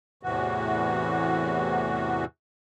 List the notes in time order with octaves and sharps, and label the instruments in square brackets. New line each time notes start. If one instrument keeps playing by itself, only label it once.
[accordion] E2 A2 C3 E3 F#4